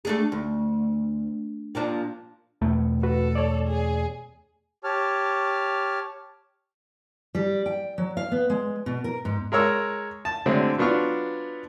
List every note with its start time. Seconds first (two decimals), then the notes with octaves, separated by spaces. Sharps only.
0.05 A3 D4 G#4
0.32 D2
1.75 A#2 F3 D4
2.62 E2 B2 A3
3.03 F#4 A4 B4
3.35 C#5 D5
3.67 G#4
4.84 G4 C#5 A5 F6
7.35 G3
7.66 G5
7.98 F#3
8.17 F5
8.32 B3
8.50 G#3
8.86 B2
9.04 A#4
9.25 G#2
9.52 G#3 A#4 C#5 E6
10.25 A5
10.46 D3 F#3 G#3 A3 C4 D4
10.78 F#3 B3 D4 F4 C#6